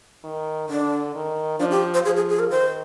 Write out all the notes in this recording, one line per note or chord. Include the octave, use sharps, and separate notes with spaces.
D#3
D3 D4
D#3
F3 D4
G4
C5
F3 G#4
G#4
G#4
A#4
D#3 C5